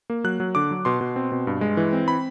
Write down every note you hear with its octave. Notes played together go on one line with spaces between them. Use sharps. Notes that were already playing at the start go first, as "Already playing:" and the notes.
A#3
F#3 F#6
F#3
D3 D6
F#3
B2 C6
B2
C4
B2
G2
G#3
E3
C4
B5